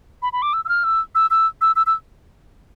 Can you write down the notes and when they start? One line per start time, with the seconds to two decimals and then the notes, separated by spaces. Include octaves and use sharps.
0.22 B5
0.33 B5
0.42 D6
0.53 E6
0.65 E6
0.69 F6
0.84 E6
1.15 E6
1.31 E6
1.61 E6
1.76 E6
1.87 E6